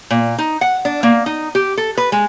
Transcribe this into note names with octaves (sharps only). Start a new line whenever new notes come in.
A#2
D#4
F#5
D4
A#3
D#4
G4
A4
B4
G#3